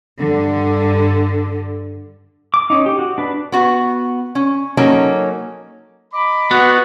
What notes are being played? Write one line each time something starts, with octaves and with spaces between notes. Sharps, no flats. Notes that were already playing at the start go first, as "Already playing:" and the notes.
G2 D3
D6
C#4 D#4
G4
F#4
D4 B4
B3 F#4 F#5
C#4
F#3 A#3 C#4 D#4 A4
D#5 A#5 B5 D6
B3 F#4 C#6